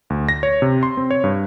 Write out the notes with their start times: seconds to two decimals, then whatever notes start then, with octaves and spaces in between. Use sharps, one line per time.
0.10 D2
0.29 A#6
0.43 C#5
0.62 C3
0.83 C6
0.97 C4
1.11 C#5
1.24 G2